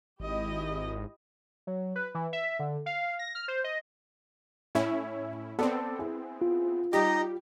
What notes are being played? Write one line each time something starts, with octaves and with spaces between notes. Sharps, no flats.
G#1 E4 G4 D#5
F#3
B4
E3
E5
D3
F5
A#6
F6
C5
D#5
A2 C#4 E4 C#5 E5
B3 C4 A4 D5
E4 G#4
F4
G3 D#4 G4 D#5